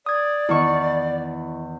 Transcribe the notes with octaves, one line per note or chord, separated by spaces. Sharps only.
D5 D#6 G#6
E2 D#3 E4 D#5 C#6